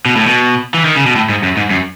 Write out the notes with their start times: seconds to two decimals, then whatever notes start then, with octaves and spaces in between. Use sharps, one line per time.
0.06 B2
0.16 A2
0.27 B2
0.74 E3
0.85 D#3
0.96 C#3
1.06 B2
1.16 A2
1.29 G#2
1.43 F#2
1.57 G#2
1.71 F#2